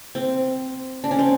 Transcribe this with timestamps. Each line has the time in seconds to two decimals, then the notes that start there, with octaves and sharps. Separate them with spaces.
0.15 C4
1.04 D4
1.11 C#4
1.19 C4